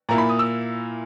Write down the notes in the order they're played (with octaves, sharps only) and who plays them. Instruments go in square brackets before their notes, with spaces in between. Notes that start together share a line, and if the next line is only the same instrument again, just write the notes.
[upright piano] A#2 A#3 E4 [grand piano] A#5
[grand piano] B5
D#6
E6